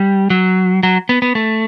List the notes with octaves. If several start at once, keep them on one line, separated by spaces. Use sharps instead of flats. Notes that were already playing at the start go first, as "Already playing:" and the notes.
Already playing: G3
F#3
F#3
B3
B3
A3